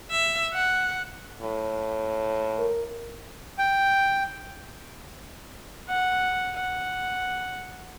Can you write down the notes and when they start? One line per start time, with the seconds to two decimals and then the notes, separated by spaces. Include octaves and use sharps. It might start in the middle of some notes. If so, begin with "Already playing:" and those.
0.11 E5
0.53 F#5
1.41 A2
2.59 A#4
3.58 G5
5.89 F#5
6.56 F#5